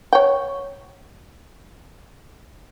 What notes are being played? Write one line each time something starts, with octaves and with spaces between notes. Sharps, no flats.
C#5 G5